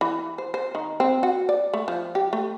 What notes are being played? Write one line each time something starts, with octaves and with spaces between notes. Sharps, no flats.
E3
C5
C5
D#3
C4
F#4
D5
A3
F3
G4
A3